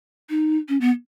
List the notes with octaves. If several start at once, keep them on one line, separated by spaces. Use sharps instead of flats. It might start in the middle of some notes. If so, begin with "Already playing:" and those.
D#4
C#4
B3